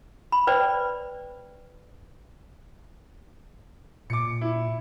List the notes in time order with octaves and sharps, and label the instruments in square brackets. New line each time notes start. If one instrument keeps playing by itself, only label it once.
[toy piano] B5
B4 C5 D5 G5
[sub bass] A#2 [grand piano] D6 C#7
[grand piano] E4